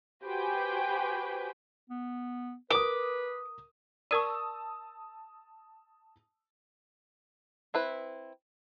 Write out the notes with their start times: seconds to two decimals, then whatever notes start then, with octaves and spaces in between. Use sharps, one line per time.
0.24 F#4 G4 B4 C5 G5 G#5
1.90 B3
2.71 A#4 B4 D6 D#6
4.11 A#4 D5 A5 C#6 D#6 E6 D#7
7.74 C4 E4 B4